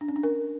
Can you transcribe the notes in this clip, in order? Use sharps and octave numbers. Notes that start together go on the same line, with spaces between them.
D4
C#4
D4
A#4